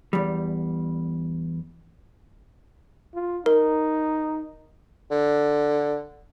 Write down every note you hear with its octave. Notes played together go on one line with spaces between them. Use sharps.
E2 G3
F4
D#4 A#4
D3